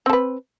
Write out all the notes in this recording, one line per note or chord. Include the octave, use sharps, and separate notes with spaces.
C4 A4 B4